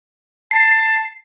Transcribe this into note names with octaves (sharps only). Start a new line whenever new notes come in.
A5 C7